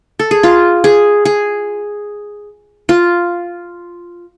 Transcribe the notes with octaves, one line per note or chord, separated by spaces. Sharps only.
A4
G#4
F4
G#4
G#4
F4